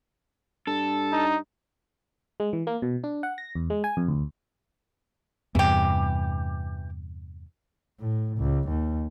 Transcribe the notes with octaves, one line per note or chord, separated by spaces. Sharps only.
G2 A4
D#4
G#3
E3
A#3
B2
D4
F#5
A#6
E2
G#3
G#5
F2
D2
E2 G2 C3 E3 G4
A2
C#2
D#2